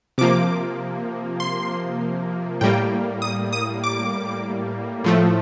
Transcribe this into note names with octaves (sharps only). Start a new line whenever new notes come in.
C3 F3 A#3 D6
C6
A2 G3 A#3 G5
D#6
D#6
D6
A2 F3 A3